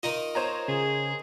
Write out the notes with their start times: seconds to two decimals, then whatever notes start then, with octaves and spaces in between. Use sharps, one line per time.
0.03 D#3 D#4 F4 D#5
0.35 C5 C#5 A#5
0.68 C#3 G#4